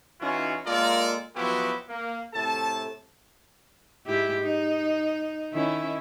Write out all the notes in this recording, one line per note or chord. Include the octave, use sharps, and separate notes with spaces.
E3 C#4 D#4 F4 F#4
G#3 A#3 F4 A4 A#4 D5
F3 F#3 B3 E4 F#4 G4
A#3
A2 C3 A4 A5
G#2 E4 G4
D#4
D#3 C#4 E4